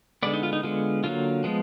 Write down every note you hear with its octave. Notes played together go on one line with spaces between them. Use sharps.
D3 G#3 B3 D5
D#4
F4
D#4
D3 G#3 B3 F4
D3 F#3 A#3 F4
F3 G#3 B3